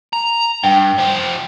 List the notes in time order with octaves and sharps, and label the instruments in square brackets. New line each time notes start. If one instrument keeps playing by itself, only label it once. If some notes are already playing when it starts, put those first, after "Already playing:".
[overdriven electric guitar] A#5
[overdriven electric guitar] G2 [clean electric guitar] G5
[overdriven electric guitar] F3 G4